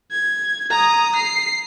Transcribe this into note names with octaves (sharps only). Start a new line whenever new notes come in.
G#6
A#5 D#6
C7